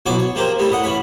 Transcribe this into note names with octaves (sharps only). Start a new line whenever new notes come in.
B1 B2 E3 F#3 F#4 D6
C#5
F3 A#3 G4 A#4 C5
G3 A3 A#3 E4
A2 D#5 F#5
A2 E3 C#4 B5